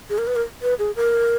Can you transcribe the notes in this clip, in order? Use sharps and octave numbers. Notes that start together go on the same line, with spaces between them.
G#4
A#4
B4
A#4
B4
G#4
A#4